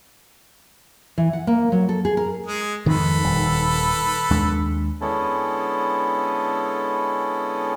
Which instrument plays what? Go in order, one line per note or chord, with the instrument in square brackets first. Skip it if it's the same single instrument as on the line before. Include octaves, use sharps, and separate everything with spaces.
[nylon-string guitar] E3
F#5
A#3
F#3
A4
G#4
A#4
[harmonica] G#3 G#4
[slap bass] F2 G#2 [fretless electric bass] D#3 [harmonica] A4 B4
[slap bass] D#1 G3
D#2 G#3 D4
[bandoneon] D3 G#3 B3 C#4 E4 A4